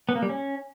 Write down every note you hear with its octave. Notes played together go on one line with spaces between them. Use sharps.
B3
A#3
G3
C#4